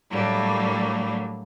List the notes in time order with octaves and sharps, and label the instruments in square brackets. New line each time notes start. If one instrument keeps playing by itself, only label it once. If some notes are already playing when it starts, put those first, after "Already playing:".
[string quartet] A2 F#3 G3 A3 A#3 D4